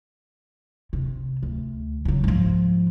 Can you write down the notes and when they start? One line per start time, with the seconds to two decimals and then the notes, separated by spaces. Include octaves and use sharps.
0.93 C3
1.43 D2
2.05 C#3 F#3
2.24 G#2 F3